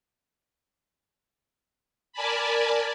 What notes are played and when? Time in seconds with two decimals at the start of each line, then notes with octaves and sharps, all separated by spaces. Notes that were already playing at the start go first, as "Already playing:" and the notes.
2.13 A#4 D5 G#5 A5 B5